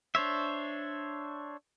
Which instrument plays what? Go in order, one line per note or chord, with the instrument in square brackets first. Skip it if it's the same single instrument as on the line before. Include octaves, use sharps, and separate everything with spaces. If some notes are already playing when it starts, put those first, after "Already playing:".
[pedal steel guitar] D4 C5 C#5 E5